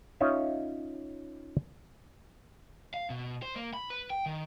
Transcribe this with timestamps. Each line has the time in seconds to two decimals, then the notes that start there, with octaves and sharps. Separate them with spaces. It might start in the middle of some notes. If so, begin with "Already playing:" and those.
0.21 C#4 D#4 F4 C#5 E5
2.94 F5
3.10 B2
3.43 C5
3.56 A#3
3.74 B5
3.90 B4
4.10 G5
4.26 D#3